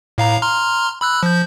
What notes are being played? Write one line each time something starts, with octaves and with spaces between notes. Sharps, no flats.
A2 F5 A#5
A#5 C6 F6
B5 E6 F#6
F3 G6